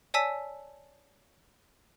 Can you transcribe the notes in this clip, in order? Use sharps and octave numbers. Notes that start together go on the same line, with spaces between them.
C#5 D5 G#5 A5 E6 B6